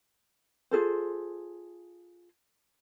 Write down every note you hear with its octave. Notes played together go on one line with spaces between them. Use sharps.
F4 G#4 A4 C5